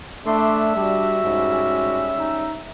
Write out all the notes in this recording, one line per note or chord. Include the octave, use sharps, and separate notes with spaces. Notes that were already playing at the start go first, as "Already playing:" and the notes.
A3 D4 E5 C6
G3 D4 F#4
G#2 G3 G#3 C#4
D#4